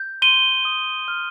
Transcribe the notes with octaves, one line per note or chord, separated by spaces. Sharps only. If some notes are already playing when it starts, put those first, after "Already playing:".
Already playing: G6
C6 D#7 G7
D#6
F6